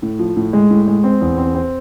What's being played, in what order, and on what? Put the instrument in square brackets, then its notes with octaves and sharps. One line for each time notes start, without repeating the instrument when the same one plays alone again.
[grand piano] A2
F3
A2
G#3
A2
G#3
C4
E2
C4
C4